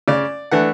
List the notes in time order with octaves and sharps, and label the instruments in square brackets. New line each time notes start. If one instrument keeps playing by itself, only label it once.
[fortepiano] C#3 D5
E3 A3 D4 F#5